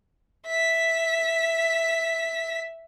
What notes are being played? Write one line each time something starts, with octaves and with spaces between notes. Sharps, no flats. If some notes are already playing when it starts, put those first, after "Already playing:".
E5 B6